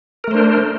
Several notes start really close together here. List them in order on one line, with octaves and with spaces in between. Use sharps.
A#4 A3 C5 D4